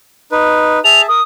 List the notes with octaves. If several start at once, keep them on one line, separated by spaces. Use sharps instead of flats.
D#4 B4
G#4 E5 A5 F7
A#4 D#6